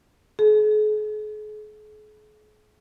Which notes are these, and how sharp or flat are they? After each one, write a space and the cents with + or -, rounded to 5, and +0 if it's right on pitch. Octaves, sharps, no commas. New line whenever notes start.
G#4 +40